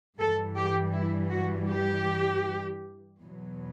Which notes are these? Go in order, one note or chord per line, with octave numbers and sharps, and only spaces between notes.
G2 E3 G3 A4
G4
E4
F#4
G4
E2 B2 F#3